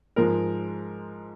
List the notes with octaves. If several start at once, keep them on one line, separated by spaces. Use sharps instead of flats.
G#2 F3 G#3 A#4